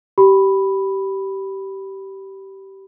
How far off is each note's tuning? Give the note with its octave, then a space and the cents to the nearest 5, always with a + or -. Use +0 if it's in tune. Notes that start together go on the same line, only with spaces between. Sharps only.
G4 -20 B5 +0